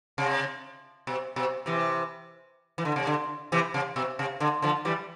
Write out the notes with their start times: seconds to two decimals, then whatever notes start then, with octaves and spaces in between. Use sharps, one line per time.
0.18 C3
1.07 B2
1.36 B2
1.66 C3 E3
2.78 E3
2.85 D3
2.96 C3
3.07 D3
3.52 C3 E3
3.74 C3
3.96 B2
4.19 C3
4.40 D3
4.62 D3 F3
4.85 E3 G3